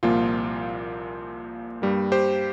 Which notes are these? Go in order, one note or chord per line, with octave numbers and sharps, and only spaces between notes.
C2 A#2 F3 A#3 F4
G2 G3 A#3
G4 C5